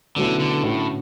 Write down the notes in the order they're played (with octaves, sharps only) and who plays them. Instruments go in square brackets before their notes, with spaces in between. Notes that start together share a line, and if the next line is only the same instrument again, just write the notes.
[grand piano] B2 F#3 A3 C#4 E4 [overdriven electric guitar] D3
[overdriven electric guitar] D3
[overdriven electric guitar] A2 [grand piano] D3 A3 C#4 F#4